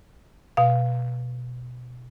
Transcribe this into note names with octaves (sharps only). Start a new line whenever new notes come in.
B2 F5